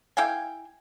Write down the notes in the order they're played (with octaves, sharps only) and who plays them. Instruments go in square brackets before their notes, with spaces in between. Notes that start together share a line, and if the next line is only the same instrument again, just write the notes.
[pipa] E4 F5 G5 G#5